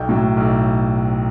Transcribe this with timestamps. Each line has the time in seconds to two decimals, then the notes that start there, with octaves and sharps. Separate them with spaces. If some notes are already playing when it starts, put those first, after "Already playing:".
Already playing: B1 G5
0.09 A2 F#3
0.37 B1